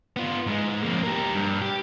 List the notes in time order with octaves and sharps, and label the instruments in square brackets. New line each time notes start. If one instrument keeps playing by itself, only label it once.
[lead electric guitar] B3 F4
G#2 G#3
F2 A#3
G4 A#4
G2
G4